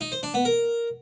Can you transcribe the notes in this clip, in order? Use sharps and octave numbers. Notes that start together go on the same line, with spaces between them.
D#4
C5
D4
B3
A#4